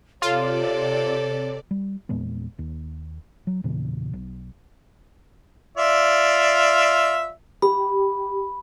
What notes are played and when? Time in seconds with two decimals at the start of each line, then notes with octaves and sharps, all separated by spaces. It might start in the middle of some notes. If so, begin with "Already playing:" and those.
0.22 C3 F4 A4 C#5 D5
1.71 G3
2.09 E2 A#2 G#3 B3
2.59 D#2
3.47 F#3
3.64 E2 A#2 C#3 E3
4.13 B1
5.77 F4 D5 E5
7.62 G4 B5